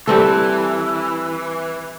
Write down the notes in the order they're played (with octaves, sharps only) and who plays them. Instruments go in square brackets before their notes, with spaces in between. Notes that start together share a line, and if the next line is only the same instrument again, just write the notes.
[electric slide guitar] E3 [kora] G3 C4 A4